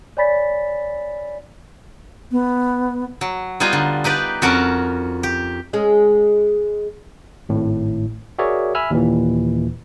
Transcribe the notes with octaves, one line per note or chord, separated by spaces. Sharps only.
C#5 D5 G#5 B5 A6 B6
B3
F#3
G3 B3 D#4 F4 G#5 A#5
D3
D#4 G4 B4 D5
F2 C#4 F#4 A#4 F#5 A5
G4
G#3 C#4 G#4
G#1 A2
F#4 G#4 A#4 C#5 D5 E5
E5 G#5 B5 E6 F6
D#2 A#2 E3